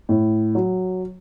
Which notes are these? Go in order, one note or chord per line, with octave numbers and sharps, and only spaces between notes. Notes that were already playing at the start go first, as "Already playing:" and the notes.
A2
F#3